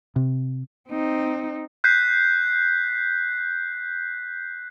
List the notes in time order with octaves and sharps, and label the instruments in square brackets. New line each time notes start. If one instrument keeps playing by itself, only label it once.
[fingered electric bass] C3
[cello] C4 D#4
[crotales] F#6 G6 B6 C7